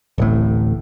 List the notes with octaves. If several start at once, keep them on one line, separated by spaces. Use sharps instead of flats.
D1 A1 A2